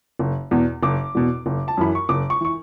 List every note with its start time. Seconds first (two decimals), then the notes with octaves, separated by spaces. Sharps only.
0.19 F#1
0.51 E2 B2
0.83 F#1 D6
1.15 E2 B2
1.46 F#1
1.68 A5
1.77 F#2 E3 B5
1.95 C#6
2.09 F#1 D6
2.30 C#6
2.41 E3 C#6